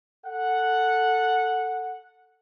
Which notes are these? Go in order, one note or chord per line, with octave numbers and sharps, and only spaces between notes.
A4 F#5